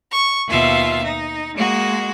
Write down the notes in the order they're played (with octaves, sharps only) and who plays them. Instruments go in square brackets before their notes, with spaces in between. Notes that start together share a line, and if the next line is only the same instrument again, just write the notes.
[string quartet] C#6
D#2 B2 F4 E5 F5
D#4
G#3 A#3 F#4